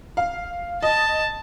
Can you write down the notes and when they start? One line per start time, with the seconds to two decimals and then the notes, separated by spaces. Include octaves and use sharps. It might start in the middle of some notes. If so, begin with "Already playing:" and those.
0.17 F5
0.83 D#5 A5